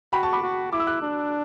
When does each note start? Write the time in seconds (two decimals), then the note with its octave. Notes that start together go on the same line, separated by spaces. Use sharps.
0.13 F#4 G5 B5
0.23 A5 C#6
0.33 B5 D6
0.42 F#4
0.72 E4 D6
0.80 E6
0.87 D6 F#6
1.02 D4